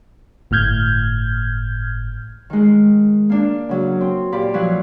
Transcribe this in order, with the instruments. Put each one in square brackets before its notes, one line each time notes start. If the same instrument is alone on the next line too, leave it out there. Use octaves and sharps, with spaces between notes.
[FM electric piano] G1 A2 F6 G6 G#6
[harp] D#3 G#3
A#3 D4
C#3 F#3
C4
A#2 G4 D5 B5
F3 F#3 E4 F#4 B4